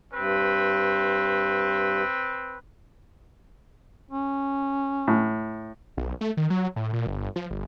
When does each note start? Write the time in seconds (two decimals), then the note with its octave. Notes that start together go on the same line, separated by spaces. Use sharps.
0.13 G2 C4 B4
4.11 C#4
5.08 A2
5.97 B1
6.21 A3
6.37 D#3
6.50 F#3
6.76 A2
6.93 A#2
7.07 G1
7.36 F3
7.51 G1